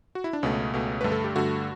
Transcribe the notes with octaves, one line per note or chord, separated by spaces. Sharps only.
F#4
E4
D4
C#2 B2 A3 C#4
C#2 B2 A3
G2 D3 A3 B4
A4
G4
G2 D3 A3 F#4